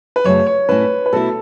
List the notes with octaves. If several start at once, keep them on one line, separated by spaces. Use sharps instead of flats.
B4
F#2 C#3 A3 C#5
C#5
A2 A3 C#4 E4 B4
B4
B2 A3 E4 A4